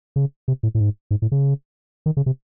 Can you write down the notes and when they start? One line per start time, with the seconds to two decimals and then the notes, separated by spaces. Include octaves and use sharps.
0.16 C#3
0.48 C3
0.63 A2
0.75 A2
0.80 G#2
1.11 G#2
1.22 A2
1.32 C#3
2.06 D#3
2.17 C#3
2.26 C3